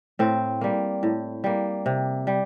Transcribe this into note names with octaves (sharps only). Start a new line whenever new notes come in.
A2 C4
G3 A#3
A2
G3 A#3
C3
G3